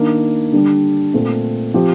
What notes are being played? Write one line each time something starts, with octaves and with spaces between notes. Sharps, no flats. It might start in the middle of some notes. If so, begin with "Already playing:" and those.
Already playing: D#3 A#3 D4
D3 G3 D4
A#2 A3 C4
F3 C4 G4